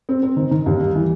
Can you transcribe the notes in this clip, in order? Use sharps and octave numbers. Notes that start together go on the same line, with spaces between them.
C4
C4
D#3
D#3
D#2
G3
E3